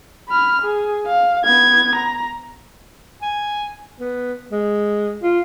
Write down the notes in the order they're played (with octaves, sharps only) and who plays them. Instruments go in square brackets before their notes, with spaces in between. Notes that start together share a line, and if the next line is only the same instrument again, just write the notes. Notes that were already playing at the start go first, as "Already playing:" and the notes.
[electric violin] B5 F6
G#4
F5
B3 G#6
A#5
[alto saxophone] G#5
B3
G#3
F4